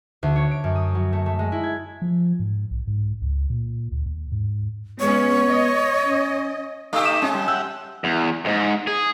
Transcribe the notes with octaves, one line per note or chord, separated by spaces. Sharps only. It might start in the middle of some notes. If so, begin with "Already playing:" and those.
D2
C#5
D7
F#2
D#6
F#3
A3
A3
G#3
E4
G#6
F3
G#2
B1
G#2
C#2
A#2
D2
D#2
G#2
G#3 B3 C#4 C#5
D#5
C#4
A3 D#4 G4 F5 C#6 E6
E7
G#3 C#4 A5
G3
G4 E5 F#5 E6
E2
D2 G#2
G#4